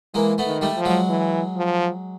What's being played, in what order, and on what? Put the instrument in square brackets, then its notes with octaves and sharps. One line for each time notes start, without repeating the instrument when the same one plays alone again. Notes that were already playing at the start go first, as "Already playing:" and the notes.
[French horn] E3 [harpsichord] G#3 A#3
[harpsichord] A3 B3
[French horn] D#3
[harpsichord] G3 A3
[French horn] F3
[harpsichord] F#3 G#3
[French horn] E3
F3